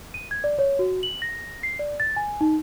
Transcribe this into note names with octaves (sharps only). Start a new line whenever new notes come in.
D#7
G#6
D5
C#5
F#4
F#7
A#6
C7
D5
A6
G#5
D#4